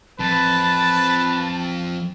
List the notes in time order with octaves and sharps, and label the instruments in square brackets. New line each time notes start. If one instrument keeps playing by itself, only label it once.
[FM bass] A1 [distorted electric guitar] F2 [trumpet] B4 [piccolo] A5